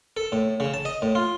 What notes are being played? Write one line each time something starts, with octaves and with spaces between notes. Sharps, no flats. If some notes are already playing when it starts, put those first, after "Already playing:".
A4
A2
C#3
A5
D#5
A2
F4